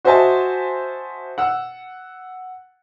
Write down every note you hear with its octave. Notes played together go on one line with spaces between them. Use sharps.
F#4 C5 D#5 E5 G#5 A5
F#5 E6